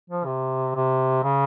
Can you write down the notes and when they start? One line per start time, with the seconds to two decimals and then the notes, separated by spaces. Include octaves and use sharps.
0.10 F3
0.26 C3
0.75 C3
1.24 C#3